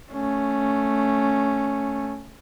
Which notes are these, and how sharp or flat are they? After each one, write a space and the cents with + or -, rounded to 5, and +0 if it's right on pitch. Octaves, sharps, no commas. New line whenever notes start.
A3 +0 C#4 +0